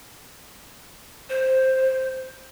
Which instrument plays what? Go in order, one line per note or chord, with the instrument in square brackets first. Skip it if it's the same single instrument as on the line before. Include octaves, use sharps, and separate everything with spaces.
[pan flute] C5